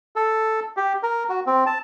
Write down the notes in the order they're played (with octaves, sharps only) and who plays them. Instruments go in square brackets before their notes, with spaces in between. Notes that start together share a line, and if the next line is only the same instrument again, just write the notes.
[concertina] A4
G4
A#4
F#4
C4
A5